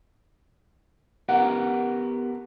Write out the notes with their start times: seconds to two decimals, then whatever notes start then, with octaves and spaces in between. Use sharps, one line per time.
1.29 B3 G4 A#4 F#5